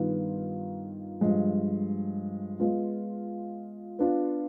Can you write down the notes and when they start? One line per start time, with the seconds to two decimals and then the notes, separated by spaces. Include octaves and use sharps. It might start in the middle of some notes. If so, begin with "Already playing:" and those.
Already playing: G2 D#3 B3 F4
1.21 G2 F3 G#3
2.60 G#3 B3 F4
3.99 B3 D4 F4